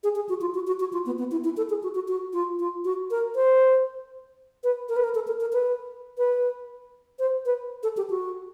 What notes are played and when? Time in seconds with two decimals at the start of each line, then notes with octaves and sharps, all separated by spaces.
0.03 G#4
0.16 G#4
0.29 F#4
0.41 F4
0.54 F#4
0.67 F#4
0.80 F#4
0.93 F4
1.06 B3
1.19 B3
1.31 E4
1.44 E4
1.57 A4
1.70 G#4
1.83 F#4
1.95 F#4
2.08 F#4
2.33 F4
2.59 F4
2.85 F#4
3.11 A#4
3.35 C5
4.64 B4
4.89 A#4
4.96 B4
5.04 A#4
5.15 A4
5.27 A#4
5.40 A#4
5.53 B4
6.18 B4
7.19 C5
7.46 B4
7.83 A4
7.97 G4
8.10 F#4